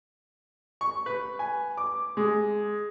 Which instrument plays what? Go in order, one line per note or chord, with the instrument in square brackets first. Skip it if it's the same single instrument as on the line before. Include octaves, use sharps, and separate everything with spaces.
[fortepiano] C#6
B4
G#5
D6
G#3